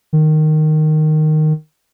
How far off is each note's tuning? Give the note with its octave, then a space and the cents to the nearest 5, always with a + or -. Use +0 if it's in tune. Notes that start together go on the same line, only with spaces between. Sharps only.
D#3 -10